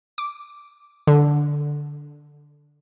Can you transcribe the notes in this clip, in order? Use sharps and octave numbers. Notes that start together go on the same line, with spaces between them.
D6
D3